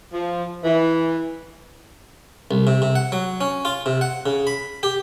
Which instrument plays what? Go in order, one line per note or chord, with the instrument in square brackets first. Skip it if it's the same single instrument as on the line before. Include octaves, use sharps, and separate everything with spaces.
[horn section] F3
E3
[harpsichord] C2
C3
C3
F#5
F#3
C#4
F4
C3
F#5
C#3
B5
G4